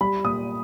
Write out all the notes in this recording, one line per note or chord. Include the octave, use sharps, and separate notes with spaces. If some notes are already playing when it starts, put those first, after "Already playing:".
G3 B5
A#2 D#6